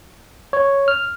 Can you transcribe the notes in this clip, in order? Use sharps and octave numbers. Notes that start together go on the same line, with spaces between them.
C#5
F6